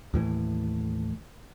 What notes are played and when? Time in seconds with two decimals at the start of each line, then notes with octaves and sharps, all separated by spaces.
0.14 D#2 A2 E3